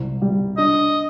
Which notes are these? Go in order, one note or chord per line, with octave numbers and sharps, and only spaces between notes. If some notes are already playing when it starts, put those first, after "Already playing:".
Already playing: C2
G3
D4 D#5